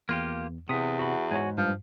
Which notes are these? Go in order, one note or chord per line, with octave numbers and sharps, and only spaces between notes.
E2 A#3 F4 G4
E2 C3 D#6 B6
F#4 B5
G#2 F#4 C#5 G#5
G2 F3